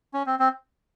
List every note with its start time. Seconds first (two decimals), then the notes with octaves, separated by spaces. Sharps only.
0.14 C#4
0.26 C4
0.39 C4